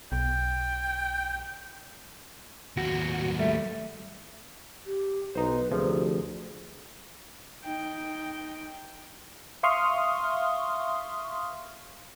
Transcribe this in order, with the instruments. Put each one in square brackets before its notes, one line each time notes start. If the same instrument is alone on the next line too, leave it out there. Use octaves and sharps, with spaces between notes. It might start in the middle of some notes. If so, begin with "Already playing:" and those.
[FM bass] B1 [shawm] G5
[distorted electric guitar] D#2 F#3 [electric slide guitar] F#4
[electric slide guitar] G3 A3 [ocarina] E5
[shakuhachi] G4
[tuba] B1 [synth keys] D#4 C5 [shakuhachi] B4
[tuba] D2 [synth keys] C3 F3 [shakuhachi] G#4
[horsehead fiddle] D#4 G5
[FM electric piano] E5 F5 C6 C#6 D#6 F6